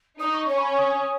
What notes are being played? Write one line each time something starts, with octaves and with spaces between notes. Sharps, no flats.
D#4 D#6
C#6
C#4 C#6
B5
C#6
D#6